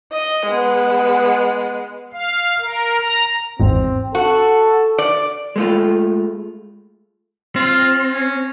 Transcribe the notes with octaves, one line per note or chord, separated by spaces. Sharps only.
D#5
G#3 B3
F5
A#4
A#5
G#1 E2 G#2 C4
F#4 A4
D5
G#3 A3 F4
C4 F4
C#4